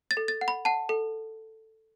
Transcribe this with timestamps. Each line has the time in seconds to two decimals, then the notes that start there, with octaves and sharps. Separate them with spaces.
0.11 A6
0.17 A4
0.28 A6
0.41 F#5
0.48 B5
0.65 F#5 A5
0.89 A4